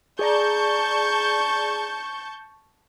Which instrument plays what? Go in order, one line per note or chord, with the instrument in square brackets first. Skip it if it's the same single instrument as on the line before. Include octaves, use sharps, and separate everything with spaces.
[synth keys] G#4 D5 A#5 [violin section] A5 C#6 G6